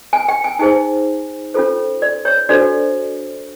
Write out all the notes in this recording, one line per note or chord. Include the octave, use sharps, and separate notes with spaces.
G#5
G5
G#5
D#4 G#4 C5 G#5
C#4 F4 A4 C5
D5
C#5
D4 F#4 A4 C5 D5